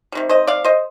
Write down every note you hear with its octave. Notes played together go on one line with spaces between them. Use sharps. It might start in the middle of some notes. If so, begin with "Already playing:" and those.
C3 D#3 G3
C5 D#5
D5 F5
C5 D#5